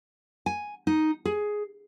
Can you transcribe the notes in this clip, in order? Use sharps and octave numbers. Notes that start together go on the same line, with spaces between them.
G#5
D#4
G#4